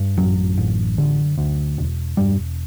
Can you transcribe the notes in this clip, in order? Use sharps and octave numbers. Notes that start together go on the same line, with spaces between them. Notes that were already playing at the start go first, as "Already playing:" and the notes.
Already playing: G2
A1 F#2 F#3
A1
D3
D2
E1
E1 G2 G3